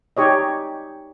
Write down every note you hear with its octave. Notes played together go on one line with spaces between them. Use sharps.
D#4 G4 C#5 D#5